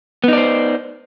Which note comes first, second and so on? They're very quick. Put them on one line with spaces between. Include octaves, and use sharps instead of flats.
B3 D#4 D5 C5